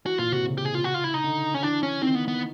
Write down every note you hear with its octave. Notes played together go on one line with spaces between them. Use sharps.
E3 F#4
A#2 F4
C3 F#4
C#3
G4
G#4
F4
F#4
F4
E4
D#4
D3
C#4
E3 D4
C#4
D#3 C4
B3
B3